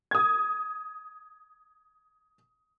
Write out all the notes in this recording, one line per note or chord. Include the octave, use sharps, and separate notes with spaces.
D#6 G#6